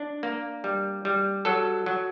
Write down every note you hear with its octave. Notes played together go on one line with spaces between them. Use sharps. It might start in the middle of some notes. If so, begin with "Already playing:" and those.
Already playing: D4
A#3
G3
G3
F#3 A4
F#3